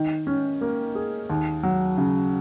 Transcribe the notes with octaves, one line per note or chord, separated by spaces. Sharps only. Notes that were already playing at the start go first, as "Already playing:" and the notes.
Already playing: D#3
C#4
A#3
G#4
D#2
F#3
C#3